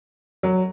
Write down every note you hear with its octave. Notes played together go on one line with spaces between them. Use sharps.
F#3